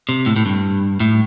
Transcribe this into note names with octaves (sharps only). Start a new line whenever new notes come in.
C3
A2
A2
G2
A2